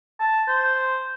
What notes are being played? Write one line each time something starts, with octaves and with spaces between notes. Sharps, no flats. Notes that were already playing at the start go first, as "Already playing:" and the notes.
A5
C5